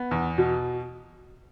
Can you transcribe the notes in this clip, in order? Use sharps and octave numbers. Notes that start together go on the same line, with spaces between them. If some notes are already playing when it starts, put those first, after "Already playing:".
Already playing: B3
E2
B2